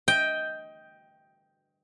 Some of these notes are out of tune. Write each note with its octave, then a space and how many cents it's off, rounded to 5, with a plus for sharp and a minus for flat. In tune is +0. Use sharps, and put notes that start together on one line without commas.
D#5 +20 G5 +0